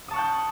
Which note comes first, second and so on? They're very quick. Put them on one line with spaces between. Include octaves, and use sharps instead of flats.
D#6 A5 C#6 F#6 G5